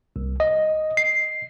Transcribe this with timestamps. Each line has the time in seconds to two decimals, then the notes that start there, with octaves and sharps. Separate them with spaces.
0.16 C2
0.40 D#5
0.97 C7